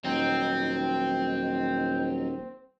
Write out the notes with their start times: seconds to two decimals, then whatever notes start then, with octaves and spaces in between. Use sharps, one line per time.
0.04 D#1 F#3 C4 D#4 G5